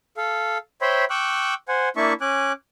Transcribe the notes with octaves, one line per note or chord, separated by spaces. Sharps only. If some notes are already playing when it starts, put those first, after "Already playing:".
A4 F5
C5 C#5 E5 G5 B5 C6
G5 C#6 D6 E6 F#6
C5 F#5 G#5
A#3 D4 E4 E5 A5 C#6
C#4 G#5 D6 F#6